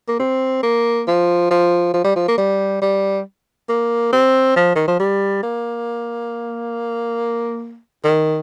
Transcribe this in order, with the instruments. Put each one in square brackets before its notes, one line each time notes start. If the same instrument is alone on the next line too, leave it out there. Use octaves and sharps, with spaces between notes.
[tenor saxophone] A#3
C4
A#3
F3
F3
F3
G3
F3
A#3
G3
G3
A#3
C4
F3
D#3
F3
G3
A#3
D#3